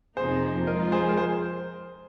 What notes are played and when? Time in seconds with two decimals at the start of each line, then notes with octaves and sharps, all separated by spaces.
0.17 F2 C3 F3 A#3 D#4 G#4 C5
0.67 F3 G#3 F4 A#4 D#5
0.92 G#4 C5
1.09 A#4
1.17 G#4 C5